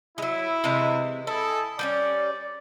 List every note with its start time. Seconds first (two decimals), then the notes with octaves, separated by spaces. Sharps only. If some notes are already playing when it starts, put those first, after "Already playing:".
0.18 F#3 G#3 E4
0.64 C3 E3 G#3
1.27 E4 A4 D#5 G#5
1.79 G3 B3 C#4 D5